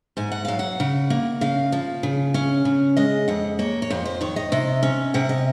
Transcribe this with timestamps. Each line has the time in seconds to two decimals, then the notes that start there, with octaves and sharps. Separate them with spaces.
0.17 G#2 G#5
0.32 F#5
0.45 F#3 F5
0.59 F#5
0.80 C#3
1.10 A#3
1.41 C#3 F5
1.72 F3
2.03 C#3
2.34 C#4
2.65 C#3
2.97 G#3 D#5
3.28 F2 F#5
3.59 A#3 C#5
3.82 C#5
3.90 F2 C5
4.05 C5
4.21 D#3 C#5
4.36 D#5
4.52 C3 D#5
4.83 C#4
5.14 C3 F#5
5.29 D#5